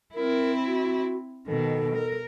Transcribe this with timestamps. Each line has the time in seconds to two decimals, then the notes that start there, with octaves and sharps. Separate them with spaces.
0.15 C4 E4 A#4
0.66 F#4
1.47 B2 D#3 A4
1.95 A#4